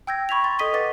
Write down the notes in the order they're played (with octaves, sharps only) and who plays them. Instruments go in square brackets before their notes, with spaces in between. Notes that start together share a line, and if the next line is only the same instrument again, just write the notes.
[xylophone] G5 E6 G6 G#6 A#6
B5 C#6 G#6 B6 F7
G5 C6 A6
A4 D#5 D#6 B6 D#7 G7
B4 D#5 F#5 D6 A6 B6